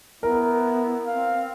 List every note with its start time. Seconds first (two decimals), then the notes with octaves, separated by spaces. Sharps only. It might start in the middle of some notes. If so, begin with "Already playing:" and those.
0.23 B3 E4 A#4
1.07 C4 F5